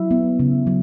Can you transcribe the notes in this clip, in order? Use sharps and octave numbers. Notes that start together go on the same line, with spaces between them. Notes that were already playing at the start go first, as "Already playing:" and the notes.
Already playing: F#3 E4 E5
B3
C#3
F#3